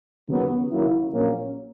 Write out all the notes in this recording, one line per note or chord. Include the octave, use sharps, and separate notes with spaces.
D#2 C#3 F#3 B3
D#2 C#3 F#3 A#3 E4
A#1 A#2 F#3 A#3 C#4